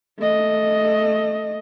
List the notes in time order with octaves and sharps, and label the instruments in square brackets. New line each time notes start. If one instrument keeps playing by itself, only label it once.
[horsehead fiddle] A3 D#5